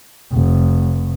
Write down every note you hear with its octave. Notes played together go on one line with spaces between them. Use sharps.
F1